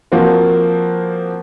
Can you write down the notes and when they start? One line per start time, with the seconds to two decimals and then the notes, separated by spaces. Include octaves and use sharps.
0.12 F3 A#3 C4 F#4 C5